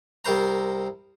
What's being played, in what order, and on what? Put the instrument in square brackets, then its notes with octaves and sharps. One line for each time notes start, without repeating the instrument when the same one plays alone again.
[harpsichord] C2 C3 A#4 C5 A#5